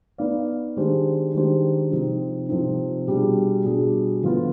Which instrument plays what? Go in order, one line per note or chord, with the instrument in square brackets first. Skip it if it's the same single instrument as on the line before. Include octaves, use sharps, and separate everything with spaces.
[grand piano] B3 D#4 B4 D5 F5
D#3 G#3 D4 G4 C5
D#3 G#3 D4 G4 C5
C3 F3 C4 D#4
C3 F3 C4 D#4
B2 G3 D4 G#4
B2 G3 D4 G#4
D3 F3 B3 F4 B4